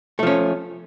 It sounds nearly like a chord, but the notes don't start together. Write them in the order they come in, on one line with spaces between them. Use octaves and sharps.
A3 F3 C#4